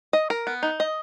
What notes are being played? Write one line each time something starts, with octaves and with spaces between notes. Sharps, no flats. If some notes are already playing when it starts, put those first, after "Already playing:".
D#5
A#4
B3
D#4
D#5